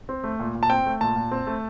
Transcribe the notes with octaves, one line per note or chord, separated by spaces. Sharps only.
C4
A3
A#2
A#2
A5
C4 G5
A3
A#2 A5
A#2
C4
A3